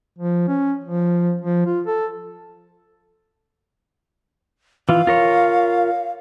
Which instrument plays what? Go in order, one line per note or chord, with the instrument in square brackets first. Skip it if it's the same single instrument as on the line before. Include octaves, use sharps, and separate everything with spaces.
[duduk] F3
C#4
F3
F3
F4
A4
[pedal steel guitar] E3 F4 [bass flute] F5
[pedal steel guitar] F4 A#4 C#5